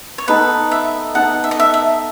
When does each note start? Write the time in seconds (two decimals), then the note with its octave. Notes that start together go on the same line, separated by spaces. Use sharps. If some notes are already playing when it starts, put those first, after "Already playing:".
0.18 C#5
0.28 B3 D#4 A4 B4
0.71 E5
1.15 B3 D#4 A4 F#5
1.44 E5
1.51 D#5
1.60 E5
1.74 E5